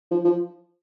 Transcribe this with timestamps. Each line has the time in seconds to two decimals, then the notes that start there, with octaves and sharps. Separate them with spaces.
0.11 F3
0.24 F3